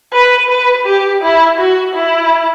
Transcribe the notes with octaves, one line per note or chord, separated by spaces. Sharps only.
B4
B4
G4
E4
F#4
E4